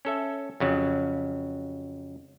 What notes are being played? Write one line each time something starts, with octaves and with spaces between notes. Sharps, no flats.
C#4 A4 E5
F2 C#3 F#3